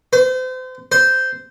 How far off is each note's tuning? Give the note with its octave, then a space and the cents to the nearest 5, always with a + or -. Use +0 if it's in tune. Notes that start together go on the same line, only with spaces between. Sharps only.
C5 -35
C5 -10